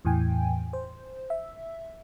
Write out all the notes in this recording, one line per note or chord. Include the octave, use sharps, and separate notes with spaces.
E2 A2 E3 G5 G#5
C5
E5